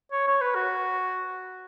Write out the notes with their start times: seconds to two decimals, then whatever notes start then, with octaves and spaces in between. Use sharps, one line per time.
0.12 C#5
0.27 C#5
0.41 B4
0.55 F#4